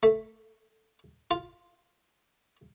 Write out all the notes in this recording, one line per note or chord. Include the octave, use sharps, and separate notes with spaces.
A3
F4